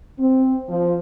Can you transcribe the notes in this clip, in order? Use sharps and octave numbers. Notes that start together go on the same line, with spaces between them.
C4
F3